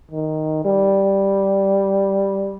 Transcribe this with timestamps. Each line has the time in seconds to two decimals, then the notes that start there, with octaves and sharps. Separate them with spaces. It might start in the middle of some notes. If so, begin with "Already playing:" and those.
0.11 D#3
0.65 G3